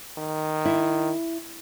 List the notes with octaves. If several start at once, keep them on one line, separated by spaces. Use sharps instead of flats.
D#3
E4